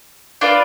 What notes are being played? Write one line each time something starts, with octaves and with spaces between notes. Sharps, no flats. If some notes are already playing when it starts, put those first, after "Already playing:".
D4 F4 B4 D5